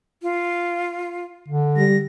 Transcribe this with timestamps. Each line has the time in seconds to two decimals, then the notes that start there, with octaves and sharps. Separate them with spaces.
0.22 F4
1.49 D3
1.77 G3 A#6